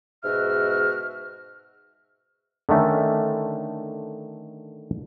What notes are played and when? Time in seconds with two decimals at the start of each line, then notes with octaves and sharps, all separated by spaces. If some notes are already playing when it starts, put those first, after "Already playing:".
0.24 G#2 B2 F#4 E5 F6
2.69 D3 D#3 A3 C#4